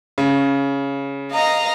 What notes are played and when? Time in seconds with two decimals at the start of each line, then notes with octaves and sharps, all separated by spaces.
0.18 C#3
1.31 D#5 F5 A#5